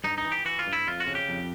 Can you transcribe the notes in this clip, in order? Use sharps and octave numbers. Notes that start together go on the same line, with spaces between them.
G2 D#4
D#4
E3
G4
E3 F#4
F4
G2
E4
F2 F4
F#4
C#3
G4
F2